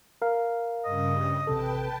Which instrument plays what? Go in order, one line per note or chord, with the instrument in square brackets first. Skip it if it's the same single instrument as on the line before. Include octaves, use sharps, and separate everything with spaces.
[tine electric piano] A#4 F5
[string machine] G2 C#3 [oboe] D#5
[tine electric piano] A1 C3 A4 [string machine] B4 G5 A5